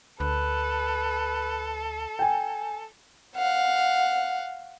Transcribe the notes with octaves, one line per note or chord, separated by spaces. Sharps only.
D2 A4 B4
G5 G#5
F5 F#5